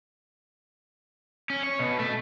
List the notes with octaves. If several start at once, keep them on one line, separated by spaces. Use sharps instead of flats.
C#4
C#5
B2
A3